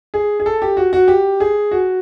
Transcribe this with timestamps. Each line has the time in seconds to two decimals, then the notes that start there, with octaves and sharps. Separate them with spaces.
0.14 G#4
0.40 G#4
0.46 A4
0.62 G4
0.77 F#4
0.93 F#4
1.08 G4
1.40 G#4
1.71 F#4